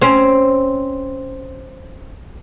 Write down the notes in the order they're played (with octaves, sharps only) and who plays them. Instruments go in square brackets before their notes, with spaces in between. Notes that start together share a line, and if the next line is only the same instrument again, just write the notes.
[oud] C4 C#4